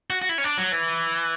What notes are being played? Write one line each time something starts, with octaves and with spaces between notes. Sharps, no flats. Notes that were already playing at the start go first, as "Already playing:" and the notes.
F#4
F#4
E4
C#4
D4
F#3
E3